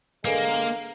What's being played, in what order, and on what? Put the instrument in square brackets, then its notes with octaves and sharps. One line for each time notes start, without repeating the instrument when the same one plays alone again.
[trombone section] D3 G#3 [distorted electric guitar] A#3 [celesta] A4 B4 F5